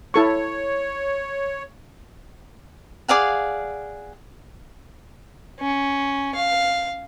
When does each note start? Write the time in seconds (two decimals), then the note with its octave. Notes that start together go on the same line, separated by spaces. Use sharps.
0.14 E4 A4 C#5 C#6
3.08 G#4 D5 F5 F#5
5.60 C#4
6.35 F5